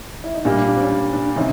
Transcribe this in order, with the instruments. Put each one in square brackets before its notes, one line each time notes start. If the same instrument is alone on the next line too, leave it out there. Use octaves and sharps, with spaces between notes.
[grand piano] E4
D#4
[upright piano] A#2 G3 A#3 [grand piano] D4
[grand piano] D4
C4
C#4
D4
D4
[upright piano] C3 D#3 [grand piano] C#4